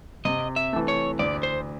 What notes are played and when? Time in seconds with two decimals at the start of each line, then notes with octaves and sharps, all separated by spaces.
0.25 C3 D#5
0.56 E5
0.73 E3 A3
0.88 C#5
1.19 D2 D5
1.43 C5